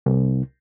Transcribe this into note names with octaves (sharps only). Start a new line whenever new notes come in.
C2